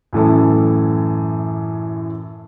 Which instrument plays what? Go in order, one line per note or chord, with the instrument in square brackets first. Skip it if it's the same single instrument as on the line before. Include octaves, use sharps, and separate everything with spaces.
[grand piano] F#2 A2 E3 A4